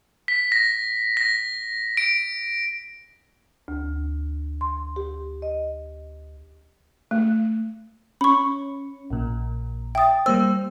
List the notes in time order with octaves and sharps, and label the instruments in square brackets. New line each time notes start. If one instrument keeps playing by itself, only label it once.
[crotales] B6
A#6
A#6
D7
[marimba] D2
C6
G4
D#5
[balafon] A3
[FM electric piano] C#4 [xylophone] B5 C#6
[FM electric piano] A#1 A#2
[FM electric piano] E5 A6 [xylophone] G5 D#6
[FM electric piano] G3 A#3 C5 [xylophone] E6